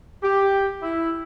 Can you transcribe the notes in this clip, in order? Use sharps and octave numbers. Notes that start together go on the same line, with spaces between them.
G4
E4